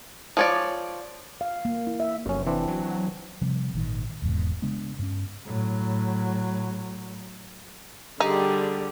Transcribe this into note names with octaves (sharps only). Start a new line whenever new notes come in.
F3 C#5 D5
F5
A#3
E4
E5
F1 F#2 C#4
E3 C4 D4
F#3
C3 F3 G3 C4
G#1 A#2 D#3
E1 E2 G#2 B2
C#3 G#3 B3 D4
G2 C#4
A2 F#3
D3 G3 D#4 G4 G#4